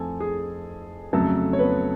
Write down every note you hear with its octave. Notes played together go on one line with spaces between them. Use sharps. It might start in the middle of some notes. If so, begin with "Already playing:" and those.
Already playing: F2 F3 A3 A4 G#5
G#4
F2 C#3 F#3 A3 A4
C#5
B3 B4